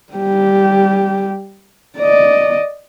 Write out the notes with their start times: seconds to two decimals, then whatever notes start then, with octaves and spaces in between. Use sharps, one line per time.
0.13 G3 G4
1.98 D5 D#5